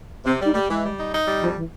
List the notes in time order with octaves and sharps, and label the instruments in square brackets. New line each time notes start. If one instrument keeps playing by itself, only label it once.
[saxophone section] C3 [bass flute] C4
[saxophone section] G3
[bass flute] D#4
[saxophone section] G3 [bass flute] A3
[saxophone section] E3 [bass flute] G#3
[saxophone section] G3
D#4
D#4
G3
[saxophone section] F2 [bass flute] F3
[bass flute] E3